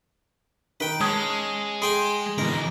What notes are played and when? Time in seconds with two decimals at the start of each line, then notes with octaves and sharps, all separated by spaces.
0.80 D#3 B4 G5
1.01 G#3 C#4 A5 D#6 G#6
1.82 G#4 G5 G#5 C6
2.38 G#2 B2 D3 E3 A#4